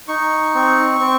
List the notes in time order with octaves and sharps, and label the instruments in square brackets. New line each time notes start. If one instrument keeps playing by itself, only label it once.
[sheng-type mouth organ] D#4 C#6
C4
C4